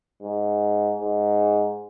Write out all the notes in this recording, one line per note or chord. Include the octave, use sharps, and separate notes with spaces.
G#2
G#2